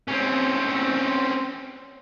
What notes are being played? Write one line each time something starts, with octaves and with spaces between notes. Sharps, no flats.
C4 C#4